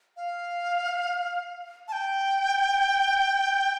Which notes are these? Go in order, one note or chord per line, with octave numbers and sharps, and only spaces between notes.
F5
A5
G5